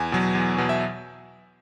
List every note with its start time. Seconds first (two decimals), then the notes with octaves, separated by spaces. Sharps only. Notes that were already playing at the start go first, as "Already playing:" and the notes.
Already playing: E2 G#5
0.12 B2 F#3
0.35 E2
0.58 B2 F#3
0.69 E5